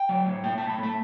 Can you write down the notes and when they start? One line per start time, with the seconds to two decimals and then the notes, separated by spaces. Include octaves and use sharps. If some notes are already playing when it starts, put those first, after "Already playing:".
Already playing: G5
0.09 F#3
0.26 A2
0.44 A3 G5
0.58 A2 A5
0.70 B5
0.79 A3 A5